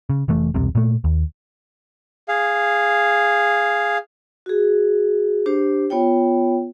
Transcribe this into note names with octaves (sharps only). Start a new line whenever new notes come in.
C#3
F1 E3 A3
E1 C2 C3
A#2 A3
D#2
G#4 F5
F#4 G#4
D4 G4 C5
B3 F4 C#5 G5